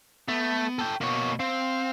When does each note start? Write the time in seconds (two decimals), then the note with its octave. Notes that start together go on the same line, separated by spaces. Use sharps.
0.28 A3 B3
0.79 A4 G5
1.01 B2 A#3 C#5
1.40 C4 F5